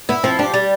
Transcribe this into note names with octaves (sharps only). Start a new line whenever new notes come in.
B3 E4
F3 C4
D4 G4
G3